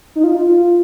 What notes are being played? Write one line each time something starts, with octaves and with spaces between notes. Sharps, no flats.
D#4
F4
F4